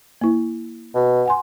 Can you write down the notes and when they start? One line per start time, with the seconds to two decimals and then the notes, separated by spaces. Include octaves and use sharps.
0.21 A#3 E4
0.95 B2
1.26 F#5 G#5 C6